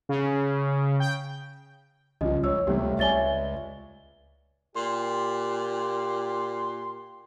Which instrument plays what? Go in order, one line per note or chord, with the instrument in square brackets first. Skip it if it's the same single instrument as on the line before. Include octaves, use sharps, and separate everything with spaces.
[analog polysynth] C#3
G5
[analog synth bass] C2 [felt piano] C#3 F3 [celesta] D#5
[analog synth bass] C#2 [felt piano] C#5 [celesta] E6
[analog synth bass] C#2 [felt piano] C3 G3 A3 [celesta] G4 C#5
[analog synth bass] C#2 [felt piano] C#5 D5 G#5 [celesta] E5 A6 G7
[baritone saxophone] A#2 [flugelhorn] G4 [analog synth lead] C6